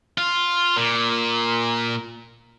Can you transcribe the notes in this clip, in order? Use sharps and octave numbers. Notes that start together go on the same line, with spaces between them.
F4
A#2